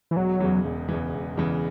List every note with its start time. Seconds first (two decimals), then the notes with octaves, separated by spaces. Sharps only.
0.11 E3
0.16 E1 F#3
0.40 E2 C#3 E3
0.64 E1
0.89 E2 C#3 E3
1.14 E1
1.37 E2 C#3 E3